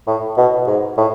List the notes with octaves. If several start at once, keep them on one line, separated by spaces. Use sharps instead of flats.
A2
B2
G#2
A2